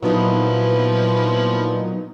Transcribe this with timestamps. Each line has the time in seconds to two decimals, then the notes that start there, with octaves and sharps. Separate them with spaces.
0.02 A#2 F3 F#3 B3 D#4 E4 B4